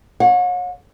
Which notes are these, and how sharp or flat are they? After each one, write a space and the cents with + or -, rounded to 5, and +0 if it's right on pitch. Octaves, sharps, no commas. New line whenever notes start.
C#5 +0 F#5 -45